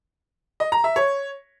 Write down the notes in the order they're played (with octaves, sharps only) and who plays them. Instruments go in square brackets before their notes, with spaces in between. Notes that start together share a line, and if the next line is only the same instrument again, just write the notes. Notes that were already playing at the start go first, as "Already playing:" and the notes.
[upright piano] D#5
A#5
E5
C#5